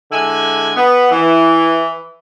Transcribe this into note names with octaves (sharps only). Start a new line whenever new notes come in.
D3 G#3 E4 G#5
B3
E3